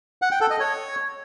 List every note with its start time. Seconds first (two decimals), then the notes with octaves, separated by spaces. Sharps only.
0.22 F#5
0.31 G5
0.41 A4
0.50 D#5
0.60 C#5